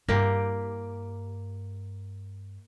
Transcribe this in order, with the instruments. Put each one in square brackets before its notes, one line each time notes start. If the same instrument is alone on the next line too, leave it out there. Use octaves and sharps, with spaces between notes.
[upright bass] G2 E4 [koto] A#3 G4